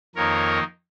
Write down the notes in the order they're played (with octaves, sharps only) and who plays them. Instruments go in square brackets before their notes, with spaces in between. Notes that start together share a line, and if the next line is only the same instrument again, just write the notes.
[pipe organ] F2 D#3 A#3 D#4 A#4 C#5